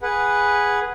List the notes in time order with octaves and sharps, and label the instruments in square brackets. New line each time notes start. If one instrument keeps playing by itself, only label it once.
[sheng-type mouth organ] G#4 B4 F#5